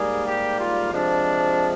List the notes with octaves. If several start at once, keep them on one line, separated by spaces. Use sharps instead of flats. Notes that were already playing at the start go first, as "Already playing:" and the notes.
Already playing: G#2 G3 A#3 G#4
G4
F4
C3 F3 G#3 D4